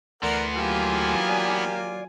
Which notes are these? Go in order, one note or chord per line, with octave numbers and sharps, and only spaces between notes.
D2 E3 A3 B3 A#4 D5 F#5 C6
F#3 A#3 F4 G4 G#5
D5